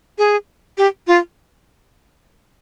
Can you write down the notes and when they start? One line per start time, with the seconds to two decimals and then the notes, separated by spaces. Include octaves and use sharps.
0.18 G#4
0.78 G4
1.07 F4